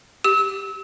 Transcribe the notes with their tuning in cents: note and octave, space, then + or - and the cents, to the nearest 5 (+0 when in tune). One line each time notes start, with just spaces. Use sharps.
G4 +0 E6 -30